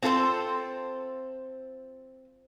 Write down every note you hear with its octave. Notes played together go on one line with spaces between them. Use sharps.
C4 F4 A4 A#4 C5